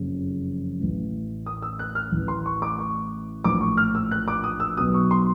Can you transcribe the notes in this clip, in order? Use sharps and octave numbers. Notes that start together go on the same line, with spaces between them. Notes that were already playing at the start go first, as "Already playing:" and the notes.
Already playing: F#1 F2 C#3
A1 A2 E3
D#6
E6
F#6
F6
A1 A2 E3
C6
C#6
D6
C#6
A#1 A2 E3 D6
C#6
F6
E6
F#6
D6
D#6
E6
B1 B2 D#6
C#6
C6